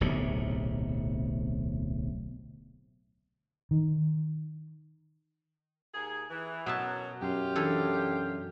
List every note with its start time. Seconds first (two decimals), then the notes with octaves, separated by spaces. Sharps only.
0.01 D1 B1 A2 C3
3.71 D#3
5.94 D#2 G#4
6.30 E3
6.66 F#2 B2 F#3 E5 A5
7.22 F#2 F4 G4
7.56 E3 D4 A4